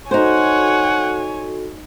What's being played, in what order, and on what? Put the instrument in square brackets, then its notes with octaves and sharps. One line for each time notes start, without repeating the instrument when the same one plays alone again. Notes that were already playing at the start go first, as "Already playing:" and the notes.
[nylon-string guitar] D#4 C5 [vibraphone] F#4 A4 [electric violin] C#5 G#5 [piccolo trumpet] F#5